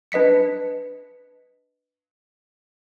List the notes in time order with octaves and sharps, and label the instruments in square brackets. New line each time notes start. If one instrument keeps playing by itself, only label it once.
[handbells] D4 B4 D#5 B6 C#7